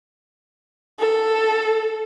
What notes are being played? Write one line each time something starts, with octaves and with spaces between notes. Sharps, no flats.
A4